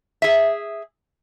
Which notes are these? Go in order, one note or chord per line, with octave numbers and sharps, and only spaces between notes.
G#4 E5